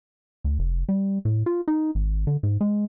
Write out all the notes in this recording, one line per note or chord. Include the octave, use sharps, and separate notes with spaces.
D2
F1
G3
A2
F4
D#4
G#1
D3
G#2
G#3